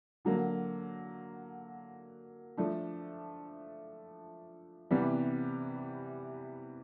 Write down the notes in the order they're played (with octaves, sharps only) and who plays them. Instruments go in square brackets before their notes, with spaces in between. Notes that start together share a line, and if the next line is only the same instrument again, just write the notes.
[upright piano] D3 F#3 A#3
F3 A3 D4
C3 E3 G3 B3